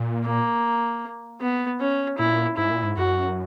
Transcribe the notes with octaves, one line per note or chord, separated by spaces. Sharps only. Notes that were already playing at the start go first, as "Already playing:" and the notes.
Already playing: A#2
A#3
B3
C#4
A#2 E4
G#2 E4
A#2
G#2
F#2 F#4